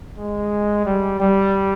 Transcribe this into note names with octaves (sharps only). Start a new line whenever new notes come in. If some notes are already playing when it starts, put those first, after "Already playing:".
G#3
G3
G3